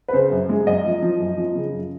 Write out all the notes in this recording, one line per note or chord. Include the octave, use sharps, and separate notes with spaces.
B4
C#3 C5
F#2
G#3
F#2 D#5
F3
F3
F#2
F3
C#3
F#2